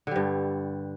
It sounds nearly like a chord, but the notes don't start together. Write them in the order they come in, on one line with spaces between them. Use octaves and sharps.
D3 G3 G2